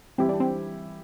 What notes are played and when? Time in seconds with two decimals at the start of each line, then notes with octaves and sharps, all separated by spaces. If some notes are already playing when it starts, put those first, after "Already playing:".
0.18 E3 G3 C4 E4 G4
0.29 D4
0.40 C4